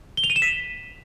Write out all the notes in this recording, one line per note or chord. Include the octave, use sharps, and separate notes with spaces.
G7
F7
D#7
E7
B6